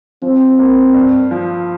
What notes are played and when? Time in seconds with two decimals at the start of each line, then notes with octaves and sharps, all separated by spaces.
0.22 F3 C4
0.59 A#3
0.94 G2
1.31 F3